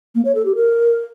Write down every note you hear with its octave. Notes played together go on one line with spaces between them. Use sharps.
A#3
C#5
A4
G4
A#4